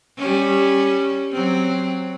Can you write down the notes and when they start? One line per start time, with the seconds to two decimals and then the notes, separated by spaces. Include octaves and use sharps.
0.18 G3 C#4
1.32 F#3 C4